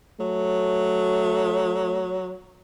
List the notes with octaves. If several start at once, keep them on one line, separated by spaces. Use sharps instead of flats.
F#3 A3